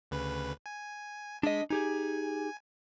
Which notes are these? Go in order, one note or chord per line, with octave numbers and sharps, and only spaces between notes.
D2 C#3 B4
G#5
G#3 D4 D#5 B6
D#4 G4 G#4 G#5